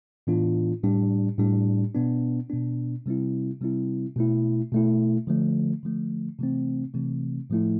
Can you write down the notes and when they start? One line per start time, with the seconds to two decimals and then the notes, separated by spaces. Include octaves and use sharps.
0.27 A2 E3 B3 D4 F4
0.84 A2 G3 D4
1.38 A2 G3 D4
1.94 B2 B3 D4
2.50 B2 B3 D4
3.06 C3 G3 C4 E4
3.61 C3 G3 C4 E4
4.16 B2 A3 E4
4.72 B2 A3 E4
5.27 D3 F3 A3
5.83 D3 F3 A3
6.39 C3 E3 A3 C4
6.94 C3 E3 A3 C4
7.50 A2 F3 A3 E4